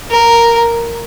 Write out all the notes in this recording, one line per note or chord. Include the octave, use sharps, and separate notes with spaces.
A#4